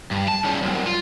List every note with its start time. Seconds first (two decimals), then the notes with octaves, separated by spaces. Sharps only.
0.11 G2
0.28 A5
0.44 C#3 G3
0.62 C2 F#2
0.86 F4